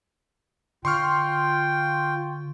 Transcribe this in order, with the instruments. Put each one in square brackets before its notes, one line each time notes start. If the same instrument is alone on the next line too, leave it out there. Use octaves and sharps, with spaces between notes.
[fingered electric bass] D3 [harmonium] F4 G5 [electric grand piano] C6 C#6 F6